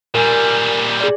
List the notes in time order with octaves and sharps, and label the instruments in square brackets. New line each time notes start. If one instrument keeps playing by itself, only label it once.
[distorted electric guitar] A#2 G3 [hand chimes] A#4 G#5
[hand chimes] G#4 D5